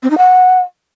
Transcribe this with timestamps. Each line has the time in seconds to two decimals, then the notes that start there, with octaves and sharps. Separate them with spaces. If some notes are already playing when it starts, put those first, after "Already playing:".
0.03 C4
0.10 D#4
0.18 F#5